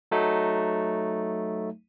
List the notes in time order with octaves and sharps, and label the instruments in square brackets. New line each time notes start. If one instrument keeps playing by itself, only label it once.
[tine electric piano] F#3 A3 D#4